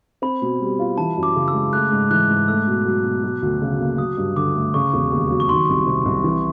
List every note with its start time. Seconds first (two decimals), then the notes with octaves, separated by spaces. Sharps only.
0.22 C4 B5
0.42 B2
0.60 G3
0.79 F4
0.98 E3 A5
1.17 F#2
1.23 D6
1.36 C#3
1.48 E6
1.54 G#3
1.73 A3 F#6
1.92 G#2
2.10 E3 F#6
2.29 G#2
2.48 A3 E6
2.67 B2
2.85 F#3
3.04 B2
3.23 F#3
3.42 D2
3.62 C#3
3.80 A#3
3.98 F#3 D#6
4.17 G2
4.36 D3 D6
4.55 A3
4.74 C#3 C#6
4.93 E1
5.11 D#2
5.30 F#3
5.40 C#6
5.49 D#3 C6
5.69 C2
5.87 C3
6.05 C2
6.24 E3